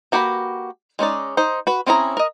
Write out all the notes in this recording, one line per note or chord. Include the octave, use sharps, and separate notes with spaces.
A#3 F#4 G4 B4 B5
G#3 C#4 D#4 D5
D#4 C5
F#4 B4
C4 C#4 E4 G#4 A#5
A#4 D#5